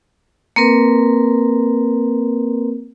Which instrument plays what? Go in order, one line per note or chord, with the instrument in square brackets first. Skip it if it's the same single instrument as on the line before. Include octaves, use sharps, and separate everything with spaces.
[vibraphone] A#3 C4 A#4 B4